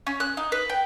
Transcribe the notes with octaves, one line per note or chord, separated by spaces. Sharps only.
C#4
F#6
D#4
B4
G5